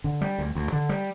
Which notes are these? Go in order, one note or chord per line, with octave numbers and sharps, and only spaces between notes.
D3
G3
D2
D2
D3
G3